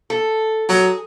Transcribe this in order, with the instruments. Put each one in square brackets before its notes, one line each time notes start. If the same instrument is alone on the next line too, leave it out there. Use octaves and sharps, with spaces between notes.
[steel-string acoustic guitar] A4
[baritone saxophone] F#3 [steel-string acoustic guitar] G#4